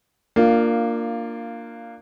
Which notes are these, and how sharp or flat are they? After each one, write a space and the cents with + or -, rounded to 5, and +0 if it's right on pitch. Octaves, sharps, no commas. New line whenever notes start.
A#3 -10 D4 +20 F4 +0